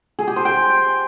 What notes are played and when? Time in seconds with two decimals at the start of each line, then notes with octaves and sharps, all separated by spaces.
0.19 G#4
0.27 G4
0.36 C5
0.45 G5